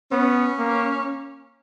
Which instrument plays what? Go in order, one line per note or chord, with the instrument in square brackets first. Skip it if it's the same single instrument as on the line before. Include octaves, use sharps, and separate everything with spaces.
[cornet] B3 [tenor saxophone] C#4
[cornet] A#3